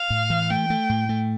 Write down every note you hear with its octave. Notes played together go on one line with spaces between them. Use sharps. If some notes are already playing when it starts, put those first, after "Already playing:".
Already playing: F5
A2
E3
A3 G5
A3
A2
A3